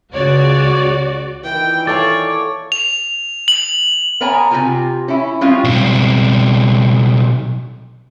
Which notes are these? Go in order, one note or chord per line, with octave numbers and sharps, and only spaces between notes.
C#2 C#3 G#3 F#4 C#5 D5
A#2 D#3 E3 G5
A4 C#5 D5 F5 A5
F7
F#7
B3 A#4 C#5 G#5 A#5
C3 D4 F4 G4 G#5
C#4 E4
G3 G#3 C4 C#4 E4 F4
B1 C4